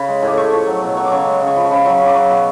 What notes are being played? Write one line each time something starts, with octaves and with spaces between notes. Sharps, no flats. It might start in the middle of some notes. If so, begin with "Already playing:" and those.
Already playing: C#3 B5
G#3
A2
D6
A3 C#6
F3
F#3
B2
F#3 C#6
D6
C#3 C#6
G#3
C#3
C#6
F3 B5
C#6
C#3 B5
F#3 C#6
C#3
D6
F#3 C#6
B2